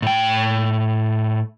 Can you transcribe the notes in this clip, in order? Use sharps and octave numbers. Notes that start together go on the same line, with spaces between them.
A2 G5